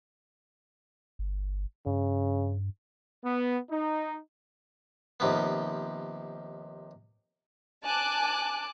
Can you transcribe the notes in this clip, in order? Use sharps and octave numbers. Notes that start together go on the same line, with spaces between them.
G1
G2 C#3
B3
D#4
D#2 C3 F3 B3
G#5 A5 D6 F#6